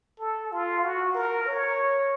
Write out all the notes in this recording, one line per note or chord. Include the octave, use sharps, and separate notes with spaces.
A4
F4
F#4
A#4
C#5